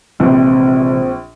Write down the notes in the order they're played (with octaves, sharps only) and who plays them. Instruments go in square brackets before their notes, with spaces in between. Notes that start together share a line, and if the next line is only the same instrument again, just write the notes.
[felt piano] A#1 [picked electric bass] C3 E3 G#3 [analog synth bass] C4